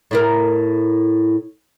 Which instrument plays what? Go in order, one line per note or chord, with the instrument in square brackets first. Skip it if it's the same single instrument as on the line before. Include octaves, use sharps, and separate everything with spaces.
[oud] A2 E4 A#4